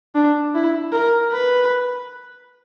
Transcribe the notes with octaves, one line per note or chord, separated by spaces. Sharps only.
D4
E4
A#4
B4